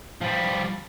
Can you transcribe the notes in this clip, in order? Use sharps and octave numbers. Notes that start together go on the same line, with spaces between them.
F3 G3